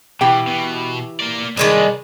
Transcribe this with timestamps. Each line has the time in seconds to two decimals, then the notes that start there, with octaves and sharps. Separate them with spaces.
0.21 B2 E3 G4 G5
0.48 B2
1.20 A#3 D5
1.57 C2 D#3 G#3 D4 B4